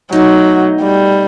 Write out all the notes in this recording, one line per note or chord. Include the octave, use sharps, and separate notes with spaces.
B2 F#3 A3 D#4
G3